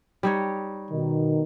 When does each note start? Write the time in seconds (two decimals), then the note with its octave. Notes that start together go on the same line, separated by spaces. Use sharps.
0.23 G3 D#4 C#5
0.91 B2 D#3